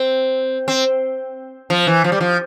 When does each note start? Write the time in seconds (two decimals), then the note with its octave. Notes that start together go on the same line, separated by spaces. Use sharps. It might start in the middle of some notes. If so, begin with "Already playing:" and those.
Already playing: C4
0.68 C4
1.70 F3
1.87 E3
2.04 F3
2.12 G3
2.21 F3